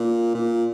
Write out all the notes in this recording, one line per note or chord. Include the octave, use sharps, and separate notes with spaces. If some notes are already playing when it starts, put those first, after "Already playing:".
Already playing: A#2
A#2